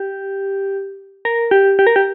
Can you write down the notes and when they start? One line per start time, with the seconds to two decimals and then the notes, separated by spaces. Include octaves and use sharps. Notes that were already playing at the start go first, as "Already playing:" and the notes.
Already playing: G4
1.25 A#4
1.51 G4
1.79 G4
1.87 A#4
1.96 G4